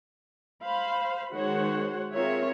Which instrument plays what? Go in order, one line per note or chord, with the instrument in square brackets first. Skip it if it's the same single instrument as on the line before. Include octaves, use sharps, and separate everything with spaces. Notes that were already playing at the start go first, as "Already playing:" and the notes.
[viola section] C5 F5 B5
D#3 G#3 F#4 C5 C#5 F#5
C4 F4 G#4 A#4 C#5 E5